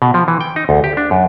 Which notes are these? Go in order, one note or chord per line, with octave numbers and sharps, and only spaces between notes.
B2
F3
E3
G5
D#4
D2
G4
D4
F#2